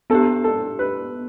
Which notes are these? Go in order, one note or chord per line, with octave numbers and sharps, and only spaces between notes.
B3 D4 G4 A4
A4
B4